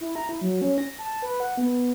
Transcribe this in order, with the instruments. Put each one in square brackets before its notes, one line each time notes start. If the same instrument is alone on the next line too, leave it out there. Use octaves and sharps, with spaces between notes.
[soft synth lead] E4
A#5
E4
F#3
C#4
A#6
A5
B4
F#5
B3